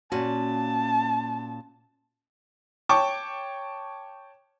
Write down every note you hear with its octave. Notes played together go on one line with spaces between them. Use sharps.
A#2 C#4 F#4 A5
C#5 G5 A5 C#6 D6